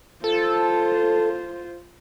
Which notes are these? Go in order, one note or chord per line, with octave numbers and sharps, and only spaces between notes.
F4 A4 C5